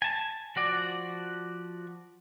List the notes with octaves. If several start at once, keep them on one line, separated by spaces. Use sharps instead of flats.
G#5 A5
F3 F#4 D5